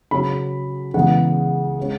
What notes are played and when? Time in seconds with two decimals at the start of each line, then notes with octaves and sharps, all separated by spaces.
0.11 C#3 F#3 C#4 B5
0.94 C#3 E3 G#3 B3 F#5
1.79 G#3 C#4